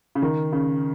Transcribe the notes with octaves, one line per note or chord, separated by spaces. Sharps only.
C#3
D#3
C#3